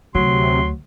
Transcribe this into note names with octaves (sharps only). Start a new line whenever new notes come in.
D2 C3 F#3 C6